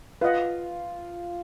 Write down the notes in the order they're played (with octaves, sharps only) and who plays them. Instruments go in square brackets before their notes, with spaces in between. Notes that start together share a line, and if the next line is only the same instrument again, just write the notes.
[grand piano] F4 [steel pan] B4 D#5 F#5